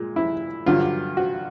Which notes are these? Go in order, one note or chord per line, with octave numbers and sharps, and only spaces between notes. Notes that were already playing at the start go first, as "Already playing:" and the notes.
Already playing: A#2 G#3
E4
G2 D3 F#3 F4
F#4